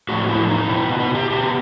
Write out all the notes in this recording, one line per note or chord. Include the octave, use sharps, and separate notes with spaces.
A2 F3 F#4
E4
D#4
B2 E4
F#4
F#4
G4
B2 G4